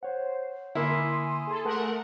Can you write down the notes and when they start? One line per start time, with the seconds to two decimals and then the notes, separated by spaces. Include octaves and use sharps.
0.03 C5 C#5 F#5
0.75 D3 A#3 E4 G#5 C6 D#6
1.47 G#4 A4
1.65 A3 A#4 F#5 A5